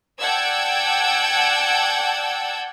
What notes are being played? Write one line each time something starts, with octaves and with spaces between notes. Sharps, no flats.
D5 F#5 G5 A5 E6 G#6